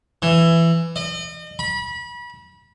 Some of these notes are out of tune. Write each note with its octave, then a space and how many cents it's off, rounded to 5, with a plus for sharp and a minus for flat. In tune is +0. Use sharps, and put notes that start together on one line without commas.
E3 +15
D#5 -40
B5 -30